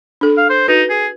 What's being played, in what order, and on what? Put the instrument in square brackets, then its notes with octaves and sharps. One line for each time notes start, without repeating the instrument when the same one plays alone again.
[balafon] D4 A4
[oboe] F5
C5
[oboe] D#4 [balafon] F#4 B4
[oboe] G#4